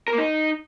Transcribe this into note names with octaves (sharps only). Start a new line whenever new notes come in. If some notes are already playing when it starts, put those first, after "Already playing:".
A#4
A#3
D#4